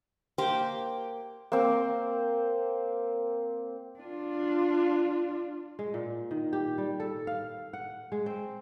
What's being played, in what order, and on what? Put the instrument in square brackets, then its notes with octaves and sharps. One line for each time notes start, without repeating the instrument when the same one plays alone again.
[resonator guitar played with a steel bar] A#3 G4 C5
[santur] A#3 C4
[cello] D4 F4
[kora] G#3
A#2
D#3
G4
G3
A4
F5
F#5
G#3
C4